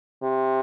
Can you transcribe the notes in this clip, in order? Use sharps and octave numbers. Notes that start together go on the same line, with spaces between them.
C3